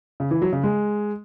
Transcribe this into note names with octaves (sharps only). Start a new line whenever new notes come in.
C#3
E3
F#3
C#3
G#3